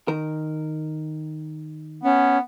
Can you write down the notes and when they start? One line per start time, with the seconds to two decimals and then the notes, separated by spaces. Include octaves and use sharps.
0.08 D#3 A#4
2.03 B3 C#4